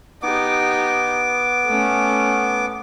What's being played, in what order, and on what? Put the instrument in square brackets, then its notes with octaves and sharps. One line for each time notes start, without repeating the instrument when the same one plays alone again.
[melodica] B3 D6 [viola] D#4 G4
[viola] A3 C#4